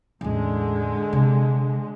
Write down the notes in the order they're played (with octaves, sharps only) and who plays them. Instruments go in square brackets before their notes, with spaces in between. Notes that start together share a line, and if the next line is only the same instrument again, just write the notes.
[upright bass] A1 E2 [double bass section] D3 G#3
[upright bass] C3